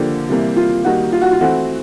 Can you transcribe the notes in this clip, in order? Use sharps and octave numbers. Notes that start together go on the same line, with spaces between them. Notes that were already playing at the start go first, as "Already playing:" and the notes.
Already playing: D3 F3 A#3 D4 G4
C3 E3 G3 A#3
F4
D#3 G3 A#3 D#4 F#4
F4
F#4
F4
E3 A3 C4 E4 F#4